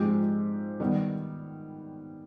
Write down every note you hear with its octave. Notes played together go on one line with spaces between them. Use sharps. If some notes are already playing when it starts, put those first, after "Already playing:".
Already playing: G#2 F3 G#3 C4 G4
D#3 G3 B3